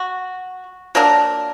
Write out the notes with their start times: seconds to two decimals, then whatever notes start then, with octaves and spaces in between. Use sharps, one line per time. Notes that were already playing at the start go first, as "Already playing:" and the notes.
Already playing: F#4
0.95 F#3 A#3 D4 A#4